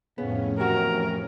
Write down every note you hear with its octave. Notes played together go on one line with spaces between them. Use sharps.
F2 A2 C#3 B3 C#4
E2 C3 C4 F#4 A#4